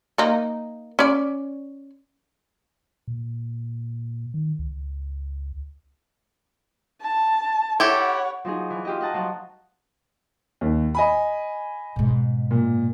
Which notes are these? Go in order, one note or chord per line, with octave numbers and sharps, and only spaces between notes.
A#3 D#4
C#4 D5
A#2
D#3
C#2
A5
E4 G4 A4 C#5 F#5
F3 F#3 D#4 G#4
E3
F4 G4 D#5
D#5 F#5 A5 A#5
F3 F#3 F#5
D#2
D#5 G#5 B5
G#2 B2
A#2